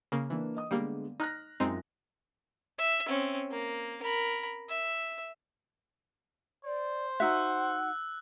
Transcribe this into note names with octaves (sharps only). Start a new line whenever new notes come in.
C#3 A#3
E3 A#3 D4 B4
D#5 D#6
D3 G3 G#3 A#3 B3
D#4 F6 F#6 A#6
F#2 G#3 C4 D#4 F4
E5
C4 C#4
A#3
A#4 B5
E5
C5 D5
D#4 F#4 E5 F#5 E6 F#6